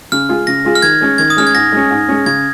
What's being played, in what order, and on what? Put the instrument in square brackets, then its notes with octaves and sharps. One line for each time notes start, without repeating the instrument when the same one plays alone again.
[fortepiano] C#3 [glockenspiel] F6
[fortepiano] G#3 F4 G#4
[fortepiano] C#3 [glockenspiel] A#6
[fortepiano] G#3 F4 G#4
[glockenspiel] F6
[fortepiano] D#3 [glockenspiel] G#6
[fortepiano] G#3 C#4
[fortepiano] D#3 [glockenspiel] G#6
[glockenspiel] D#6
[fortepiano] G#3 C#4 [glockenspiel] F6
[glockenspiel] G#6
[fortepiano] G#2 [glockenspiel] A#6
[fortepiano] G#3 C#4
G#2
G#3 C#4
[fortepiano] C#3 [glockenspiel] G#6